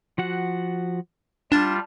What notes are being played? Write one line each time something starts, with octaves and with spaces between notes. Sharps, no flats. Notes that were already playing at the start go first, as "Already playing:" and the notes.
F3 F#4 F#5
G3 D4 F4 A5 F6 A6